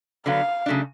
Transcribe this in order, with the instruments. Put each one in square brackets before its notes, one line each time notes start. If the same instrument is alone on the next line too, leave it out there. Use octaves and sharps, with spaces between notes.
[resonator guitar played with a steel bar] D3 F#3 B3 [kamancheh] F5
[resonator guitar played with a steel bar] C#3 F#3 A3 D4